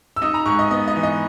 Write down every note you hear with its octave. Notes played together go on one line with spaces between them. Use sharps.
E6
D#4 D#6
A#5
G#2 C#6
D#5
B3 D#5
D#5
E3
D#5